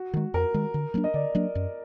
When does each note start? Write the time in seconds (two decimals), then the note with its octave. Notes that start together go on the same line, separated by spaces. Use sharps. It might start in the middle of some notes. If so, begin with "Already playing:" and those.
Already playing: F#4
0.14 D#3 G#3
0.34 F2 A#4
0.54 D#3 G#3
0.74 D3
0.94 F#3 A#3 D4
1.04 D#5
1.14 D3 D5
1.35 F#3 A#3 D4
1.55 F#2